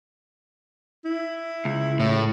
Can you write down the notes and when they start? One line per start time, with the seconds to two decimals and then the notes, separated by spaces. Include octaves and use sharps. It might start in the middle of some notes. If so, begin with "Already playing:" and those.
1.05 E4
1.65 C#2
2.00 A2